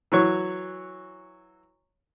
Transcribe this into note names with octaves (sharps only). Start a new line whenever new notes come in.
E3 F#3 C#5